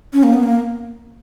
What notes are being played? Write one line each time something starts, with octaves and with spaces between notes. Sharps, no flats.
C#4
A#3
B3
A#3